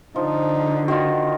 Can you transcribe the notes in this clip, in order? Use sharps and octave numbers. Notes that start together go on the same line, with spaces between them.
D3 F3 D#4
D#3 F4 F#4 D#5 F#5